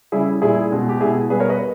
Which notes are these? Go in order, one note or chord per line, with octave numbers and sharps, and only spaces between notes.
C#3 G3 E4 G#4
A#2 G3 E4 G#4
B2 G#3
G4
B2 G#3 E4 G#4
B2 G3 G#4 B4
A#4 C#5
B4 D#5